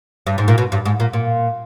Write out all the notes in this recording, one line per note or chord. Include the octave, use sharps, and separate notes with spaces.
G2
G#2
A#2
B2
G2
G#2
A#2
A#2